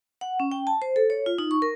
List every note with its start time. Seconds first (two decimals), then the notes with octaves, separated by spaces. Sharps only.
0.21 F#5
0.40 C#4
0.52 G5
0.67 A5
0.82 C5
0.96 A4
1.10 C#5
1.26 F4
1.38 D#4
1.51 C#6
1.62 A#4